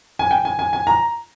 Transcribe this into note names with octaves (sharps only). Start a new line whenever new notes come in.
G#5
G5
G#5
G#5
G#5
A#5